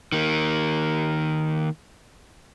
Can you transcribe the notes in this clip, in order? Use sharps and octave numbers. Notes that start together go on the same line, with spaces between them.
D#3 A#3